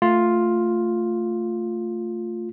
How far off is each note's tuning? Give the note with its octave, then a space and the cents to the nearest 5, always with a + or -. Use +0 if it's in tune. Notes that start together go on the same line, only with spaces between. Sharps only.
A3 +15 F4 +5